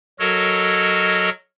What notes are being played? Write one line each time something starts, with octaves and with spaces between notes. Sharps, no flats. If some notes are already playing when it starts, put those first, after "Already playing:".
F#3 F#4 A4 A#4 C#5 D#5